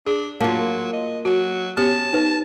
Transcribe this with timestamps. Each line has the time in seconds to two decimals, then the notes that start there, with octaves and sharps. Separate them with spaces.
0.06 D4 G#4
0.41 F#3 A#3 F4 F5 A5
0.93 D#5
1.25 F#3 F#4
1.77 B3 C#4 G4 A5
2.13 D#4 B4 E5